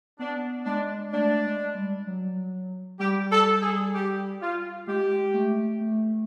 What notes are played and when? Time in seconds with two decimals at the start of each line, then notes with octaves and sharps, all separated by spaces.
0.19 B3 D4
0.66 G#3 D4
1.12 A3 D4
1.44 G#3
1.75 G3
2.07 F#3
3.00 G3 G4
3.32 A4
3.62 G#4
3.94 G4
4.41 F4
4.87 G#3 G4
5.34 A3
5.81 A3